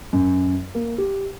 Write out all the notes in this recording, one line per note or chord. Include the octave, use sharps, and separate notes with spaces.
F#2
A#3
G4